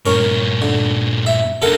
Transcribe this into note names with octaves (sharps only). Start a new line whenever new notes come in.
G2 A#2 C#4 A#4
D3
E5
C2 D3 A4 A#4 F#5